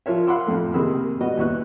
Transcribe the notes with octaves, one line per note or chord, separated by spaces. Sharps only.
F3 F4 A#4 C#5 E5
F5 F#5 B5 C6 D6 E6
F2 A2 A3
C3 D#3 A#3 G#4 B5 E6
G3 B3 F#4 D#5
D#2 B2 E4 B4 C#6 F#6